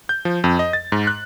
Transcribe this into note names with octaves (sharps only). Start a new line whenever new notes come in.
G6
F3
F2
D#5
A6
G#2
F#6